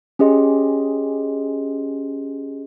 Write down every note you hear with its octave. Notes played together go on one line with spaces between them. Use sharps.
C#4 G4 G#4 D#5 C6